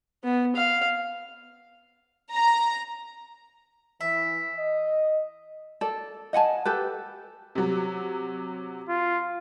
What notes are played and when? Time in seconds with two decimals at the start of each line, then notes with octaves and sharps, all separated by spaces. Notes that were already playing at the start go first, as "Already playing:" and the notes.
0.24 B3
0.56 F5
2.33 A#5
4.01 E3 E5
4.54 D#5
5.81 A4 D5
6.33 D#5 F#5 G#5 A5
6.65 G4 A4 B4
7.55 C3 F#3
8.89 F4